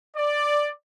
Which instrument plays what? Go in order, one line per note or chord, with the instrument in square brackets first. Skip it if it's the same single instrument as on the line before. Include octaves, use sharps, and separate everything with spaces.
[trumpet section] D5